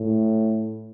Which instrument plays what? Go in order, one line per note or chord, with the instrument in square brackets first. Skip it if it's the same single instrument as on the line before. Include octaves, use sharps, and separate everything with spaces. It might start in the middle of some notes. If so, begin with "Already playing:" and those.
Already playing: [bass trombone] A2